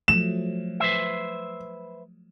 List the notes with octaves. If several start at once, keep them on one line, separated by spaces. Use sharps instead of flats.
F3 F#3 A3 E7
B4 C5 E5